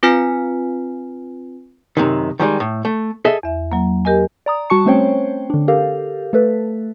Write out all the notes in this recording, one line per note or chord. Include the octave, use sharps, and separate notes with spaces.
C4 F4 B4 G#5 F6 B6
F#2 C3 D#3
D#3 F3 G3 G#3
A2
A3
G#4 A4 D#5 E5
E2 E5
F#3 A#3
G4 A#4 D#5 G#5
D5 A#5 D#6
G3 F#4 A5 C#6 C#7
A3 C4 C#4 C5 C#5 G5
D3 D4
G4 A4 A#4 F5
A3 A4 B4